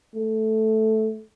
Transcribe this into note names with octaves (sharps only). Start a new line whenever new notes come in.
A3